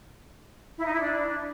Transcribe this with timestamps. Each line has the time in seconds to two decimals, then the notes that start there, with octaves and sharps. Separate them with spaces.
0.77 E4
0.84 D#4
0.92 E4
1.00 D4